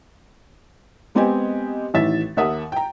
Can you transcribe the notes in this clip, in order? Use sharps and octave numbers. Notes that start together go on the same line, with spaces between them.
G#3 B3 C4 G4 D#5 G#5
A1 D#3 E3 E5 A6
D#2 A#4 E5 F#5 D#6
G5 A#5